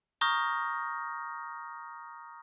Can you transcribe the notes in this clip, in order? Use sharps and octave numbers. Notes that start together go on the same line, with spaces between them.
A#5 C#6 D#6 F6 G6 A#6